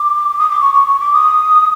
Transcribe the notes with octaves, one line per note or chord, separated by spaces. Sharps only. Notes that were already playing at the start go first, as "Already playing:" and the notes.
Already playing: D6
D#6
D6
C#6
C#6
C#6
D6
D#6